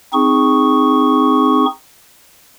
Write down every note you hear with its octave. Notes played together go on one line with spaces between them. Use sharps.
C4 D#4 G#4 C#6